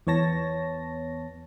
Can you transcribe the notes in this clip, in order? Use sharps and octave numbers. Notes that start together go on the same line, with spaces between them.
E2 B3 C#5 A5 A#6